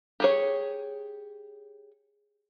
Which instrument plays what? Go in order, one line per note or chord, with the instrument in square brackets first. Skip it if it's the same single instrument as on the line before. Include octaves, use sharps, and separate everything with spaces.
[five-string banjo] G4 G#4 C#5